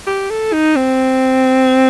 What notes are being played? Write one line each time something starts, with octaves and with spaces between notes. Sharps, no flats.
G4
A4
D#4
C4